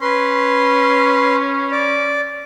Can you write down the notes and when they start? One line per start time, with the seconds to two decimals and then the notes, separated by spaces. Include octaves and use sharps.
0.01 C#4 B4 C6
1.71 D5